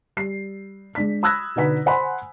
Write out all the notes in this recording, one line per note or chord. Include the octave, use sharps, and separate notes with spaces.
G3 C7
G#3 D4 B6
B5 D#6 E6 F#6 G#6 A#6
B2 D3 D#4 B4 F#5 B6
C5 F#5 G#5 B5 C6